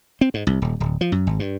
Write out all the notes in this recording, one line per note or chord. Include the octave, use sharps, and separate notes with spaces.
C4
G#2
C2
D#1
D1
F3
F#2
G#1
G2